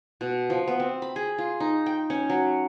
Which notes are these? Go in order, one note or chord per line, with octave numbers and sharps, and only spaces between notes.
B2
F3
B3
C4
B5
G#4
F4
D#4
G5
C#4
F#3